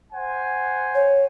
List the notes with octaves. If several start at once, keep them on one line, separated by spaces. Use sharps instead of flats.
C5 F#5 G#5
C#5